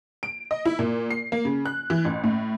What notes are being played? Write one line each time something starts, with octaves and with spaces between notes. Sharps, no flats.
D7
D#5
E4
A#2
C7
A#3
C#3
F#6
E3
A1
A2